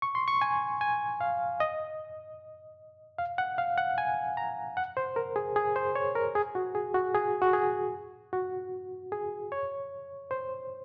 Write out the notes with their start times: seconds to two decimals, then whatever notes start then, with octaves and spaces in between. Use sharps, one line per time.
0.02 C#6
0.15 C6
0.28 C#6
0.41 G#5
0.81 G#5
1.21 F5
1.60 D#5
3.18 F5
3.38 F#5
3.58 F5
3.78 F#5
3.98 G#5
4.37 A#5
4.77 F#5
4.97 C5
5.16 A#4
5.36 G#4
5.56 G#4
5.76 C5
5.95 C#5
6.16 A#4
6.35 G#4
6.55 F#4
6.75 G#4
6.94 F#4
7.14 G#4
7.42 F#4
7.53 G#4
8.33 F#4
9.12 G#4
9.52 C#5
10.31 C5